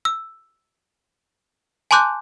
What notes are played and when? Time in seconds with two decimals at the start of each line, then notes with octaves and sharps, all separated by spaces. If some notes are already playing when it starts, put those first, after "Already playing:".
0.05 E6
1.91 G#5 A5 C6 D6 F#6 G6